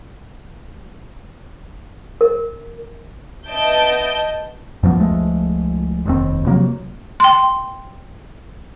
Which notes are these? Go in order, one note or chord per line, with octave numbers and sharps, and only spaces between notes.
A#4
B3 D#5 E5 A5 G6 D7
F#2 F3 A3 B3
C#2 F3 G#3 A3
F1 D#2 C4
C3 F3 F#3 A#3
G5 C6